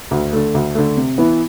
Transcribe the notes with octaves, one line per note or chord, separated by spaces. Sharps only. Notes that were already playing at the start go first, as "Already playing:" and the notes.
D2
D3 A3
D2
D3 A3
C3
E3 B3 E4